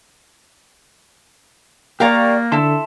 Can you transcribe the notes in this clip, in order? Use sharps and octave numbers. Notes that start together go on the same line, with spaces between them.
A#3 G4 A#4 D5 F5 A#5 C#6
D3 E4 A4 E5 A5 C6